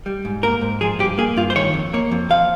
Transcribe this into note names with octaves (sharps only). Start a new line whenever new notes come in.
G3
G#2
A#3 A#4
G#2
F3 G#4
G2 G4
A#3 G#4
G2 F4
C5
D#3 C#5
F2
A#3 C#5
F2
F3 F5